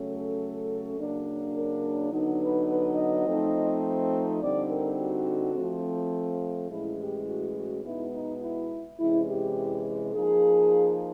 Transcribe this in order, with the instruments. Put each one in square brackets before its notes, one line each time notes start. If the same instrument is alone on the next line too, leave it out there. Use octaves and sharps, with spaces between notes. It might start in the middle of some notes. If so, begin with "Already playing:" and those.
Already playing: [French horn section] C#3 F#3 A3 C#4
A4
C#3 F#3 A#3 D4
A#4
D3 F#3 B3 D#4
B4
B4
D#5
F3 A3 C4 D#4
D3 G3 C4 D#4 D5
A#4
F#4
F3 A3 C4
A2 E3 G#3 C#4 E4
G4
F#4
F#4
B2 G#3 B3 D#4 E4
D#4
E4
C3 E3 G#3 C#4 E4
G4
F3 A#3 D#4 G#4